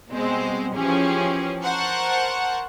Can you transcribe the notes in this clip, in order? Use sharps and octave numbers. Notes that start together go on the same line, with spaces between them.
B2 G3 G#3 C4 C5
E3 F3 C#4 G4 G#4
A#4 C5 F#5 A5 C#6